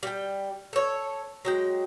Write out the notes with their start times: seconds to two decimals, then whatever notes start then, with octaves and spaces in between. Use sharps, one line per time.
0.03 G3 G5
0.73 A4 C#5
1.45 F#3 G#3 G5